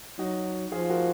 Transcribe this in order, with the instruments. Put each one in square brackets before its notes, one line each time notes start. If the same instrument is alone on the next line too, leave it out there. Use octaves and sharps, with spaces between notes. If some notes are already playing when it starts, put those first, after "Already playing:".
[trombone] F#3 [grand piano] D#4 F#4
[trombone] F3 [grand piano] F4 G#4
[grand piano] F#4 A#4